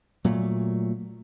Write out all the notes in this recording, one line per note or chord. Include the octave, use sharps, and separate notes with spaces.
A#2 F#3 A3